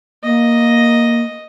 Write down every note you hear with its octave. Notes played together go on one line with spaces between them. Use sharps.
A#3 D#5